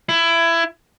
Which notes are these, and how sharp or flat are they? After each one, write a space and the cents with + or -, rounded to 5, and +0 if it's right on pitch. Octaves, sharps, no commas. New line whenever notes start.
E4 +20